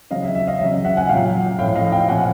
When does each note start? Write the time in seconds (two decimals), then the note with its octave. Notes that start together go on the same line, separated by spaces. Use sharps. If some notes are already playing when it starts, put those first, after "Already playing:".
0.11 C#3 F#3 D#5 F5
0.23 E5
0.35 E5
0.47 D#5 F5
0.60 C#3 F#3 E5
0.85 E5 F#5
0.97 F#5 G#5
1.09 A#2 F#3 F5 G5
1.59 A2 F3 F5 G5
1.75 D#5 F5
1.92 F5 G5
2.08 A#2 F3 F#5 G#5